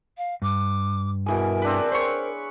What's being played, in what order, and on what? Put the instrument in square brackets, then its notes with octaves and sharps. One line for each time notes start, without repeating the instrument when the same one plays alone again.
[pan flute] F5
[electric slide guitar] G2 [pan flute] D6
[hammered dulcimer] B2 E3 G#4 [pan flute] A#4
[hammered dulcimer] C4 D4 B4
[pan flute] A#4 [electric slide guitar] C5 [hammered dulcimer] C#5 C#6